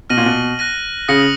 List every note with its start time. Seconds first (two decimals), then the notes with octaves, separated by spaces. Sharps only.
0.10 B2 F6 A#6 D#7 F#7
0.17 A#2
0.26 B2
0.59 F#6 A#6 D#7
1.08 C#3 D#6 A#6 C#7 F#7